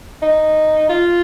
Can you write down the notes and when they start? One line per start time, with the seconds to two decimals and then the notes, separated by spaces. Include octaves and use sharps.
0.22 D#4
0.89 F4